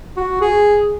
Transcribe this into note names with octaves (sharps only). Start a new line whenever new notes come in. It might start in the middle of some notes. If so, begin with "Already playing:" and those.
F#4
G#4